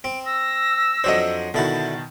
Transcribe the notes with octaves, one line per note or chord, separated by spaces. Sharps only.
C4 D7
E6 A#6
F2 F#3 D4 C5 C#5 D#5
B2 D3 D#3 E4 F#4 A5